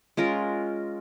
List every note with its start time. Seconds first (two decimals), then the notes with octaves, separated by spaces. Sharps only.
0.17 G#3 C#4 F4 A#4